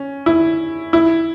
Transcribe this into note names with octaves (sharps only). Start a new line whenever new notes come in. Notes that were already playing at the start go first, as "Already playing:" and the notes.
Already playing: C#4
E4
E4